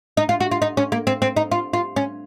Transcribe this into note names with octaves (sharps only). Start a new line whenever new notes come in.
D#4
F4
F#4
F4
D#4
C#4
A#3
C4
C4
D#4
F4
F4
C#4